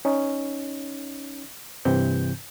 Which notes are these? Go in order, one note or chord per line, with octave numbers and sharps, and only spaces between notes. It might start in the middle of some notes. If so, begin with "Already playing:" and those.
C#4 D#4
G2 C3 E3 C4 G6